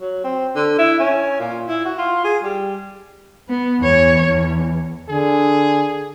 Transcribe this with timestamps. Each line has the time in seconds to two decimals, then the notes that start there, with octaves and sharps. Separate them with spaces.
0.01 F#3
0.24 C4
0.56 D3
0.78 E4
0.99 C#4
1.40 A#2
1.68 E4
1.85 F#4
1.98 F4
2.24 G#4
2.43 G3
3.49 B3
3.80 E2 C#5
4.27 E2
5.09 D3 G#4